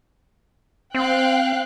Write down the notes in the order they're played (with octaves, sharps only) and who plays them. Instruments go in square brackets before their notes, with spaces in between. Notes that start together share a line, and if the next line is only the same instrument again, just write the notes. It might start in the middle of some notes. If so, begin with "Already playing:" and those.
[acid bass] C4 [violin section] F5 G5 F#6